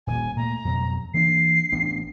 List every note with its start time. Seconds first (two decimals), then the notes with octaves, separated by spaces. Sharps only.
0.07 D#1 D#2 A#2 G#5
0.37 A#2 A3 A#5
0.65 F2 B2 F#3
1.14 E3 A#3 D4 C7
1.72 A1 B3 D4